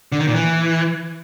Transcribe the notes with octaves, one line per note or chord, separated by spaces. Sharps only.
D3
D#3
A#2
E3